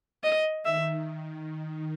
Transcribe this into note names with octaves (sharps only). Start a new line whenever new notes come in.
D#5
D#3 E5